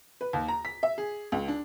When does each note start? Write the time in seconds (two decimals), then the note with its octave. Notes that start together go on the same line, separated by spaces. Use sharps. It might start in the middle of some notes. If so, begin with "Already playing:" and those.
0.21 B4
0.33 D#2
0.48 A#5
0.65 B6
0.83 E5
0.98 G#4
1.32 C#2
1.48 D4